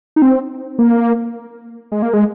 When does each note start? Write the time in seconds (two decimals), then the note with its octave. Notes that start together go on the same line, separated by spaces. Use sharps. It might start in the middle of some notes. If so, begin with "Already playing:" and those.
0.16 D#4
0.22 C4
0.79 A#3
1.92 G#3
2.02 A#3
2.14 G#3